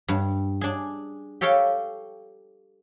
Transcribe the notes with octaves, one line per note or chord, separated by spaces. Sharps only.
G2
D4 G#4
G4 A4 C#5 F5 G5